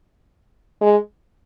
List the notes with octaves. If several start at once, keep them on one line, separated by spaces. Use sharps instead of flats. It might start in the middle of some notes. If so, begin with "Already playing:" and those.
G#3